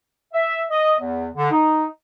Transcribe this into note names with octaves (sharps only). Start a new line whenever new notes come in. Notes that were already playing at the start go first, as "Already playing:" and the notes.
E5
D#5
E2
D3
D#4